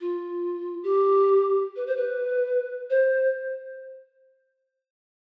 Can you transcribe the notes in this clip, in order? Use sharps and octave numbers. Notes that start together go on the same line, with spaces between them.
F4
G4
B4
C5
B4
C5